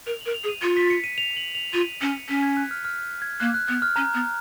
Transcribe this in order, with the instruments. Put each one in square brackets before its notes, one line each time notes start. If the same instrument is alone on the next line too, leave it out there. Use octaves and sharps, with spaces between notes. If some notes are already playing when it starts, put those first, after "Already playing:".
[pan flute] A#4 [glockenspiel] F7
[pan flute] A#4 [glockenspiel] F#7
[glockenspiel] F7
[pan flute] G#4
[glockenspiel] D#7
[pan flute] F4 [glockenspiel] C#7
[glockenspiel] B6
C#7
D#7
F7
F#7
F7
[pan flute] F4 [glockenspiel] D#7
[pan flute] C#4 [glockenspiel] C#7
[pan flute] C#4 [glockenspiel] B6
[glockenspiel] G#6
F#6
F6
F6
G#6
[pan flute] A#3 [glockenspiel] F#6
[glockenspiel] F#6
[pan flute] B3 [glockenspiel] F#6
[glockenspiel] F6
[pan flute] C#4 [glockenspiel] A#5
[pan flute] B3